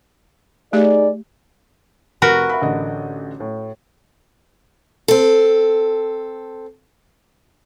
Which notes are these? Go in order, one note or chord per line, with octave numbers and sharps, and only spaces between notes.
A3 D#4 G4 G#4 D5
F1 F#4 A#4 B4
E5 F#5 B5
A1 D3 D#5
A2
C4 A4